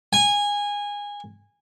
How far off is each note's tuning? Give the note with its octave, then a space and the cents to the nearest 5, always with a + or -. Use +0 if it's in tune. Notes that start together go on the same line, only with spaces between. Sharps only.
G#5 -20